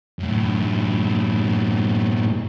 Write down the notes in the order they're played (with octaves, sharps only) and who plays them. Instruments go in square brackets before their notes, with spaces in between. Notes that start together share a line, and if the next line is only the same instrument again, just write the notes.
[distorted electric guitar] F#2 A2